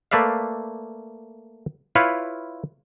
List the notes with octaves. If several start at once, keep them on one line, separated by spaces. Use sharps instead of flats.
A3 A#3 B4 D5 E5 F5
E4 F4 B4 C#5 F5